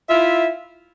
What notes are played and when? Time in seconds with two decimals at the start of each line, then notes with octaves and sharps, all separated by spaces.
0.07 E5
0.10 F4
0.13 E4